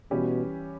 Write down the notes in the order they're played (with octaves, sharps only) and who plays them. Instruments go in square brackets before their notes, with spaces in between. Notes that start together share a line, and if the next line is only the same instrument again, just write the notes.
[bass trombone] B2 [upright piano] E3 G3 C#4 G4